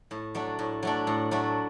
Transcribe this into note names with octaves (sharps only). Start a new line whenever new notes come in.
A2
F#3 A3 D4
A2
F#3 A3 D4
A2
F#3 A3 D4